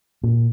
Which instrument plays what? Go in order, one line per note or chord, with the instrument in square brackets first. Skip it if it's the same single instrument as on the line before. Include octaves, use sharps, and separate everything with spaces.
[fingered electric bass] A#2